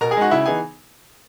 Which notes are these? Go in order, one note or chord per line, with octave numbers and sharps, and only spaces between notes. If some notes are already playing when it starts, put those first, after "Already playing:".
B2 A#4 A#5
G#4 G#5
G#3 D#4 F#4 F#5
C#3 E4 E5
E3 B3 D#4 G#4 G#5